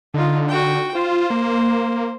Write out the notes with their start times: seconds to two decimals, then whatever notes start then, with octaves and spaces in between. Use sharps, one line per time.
0.14 D3 D#4 F4
0.48 F#4 G5
0.95 F4 C5
1.30 A#3